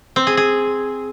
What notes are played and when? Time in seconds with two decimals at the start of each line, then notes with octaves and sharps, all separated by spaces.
0.16 C4
0.27 G#4
0.37 G#4